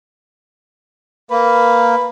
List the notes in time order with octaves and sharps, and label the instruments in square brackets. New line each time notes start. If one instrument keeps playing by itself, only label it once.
[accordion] A#3 [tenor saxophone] B4